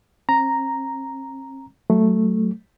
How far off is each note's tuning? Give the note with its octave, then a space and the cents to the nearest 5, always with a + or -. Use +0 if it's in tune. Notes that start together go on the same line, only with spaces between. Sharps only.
C4 +45 A#5 +0
F#3 +15 A3 +0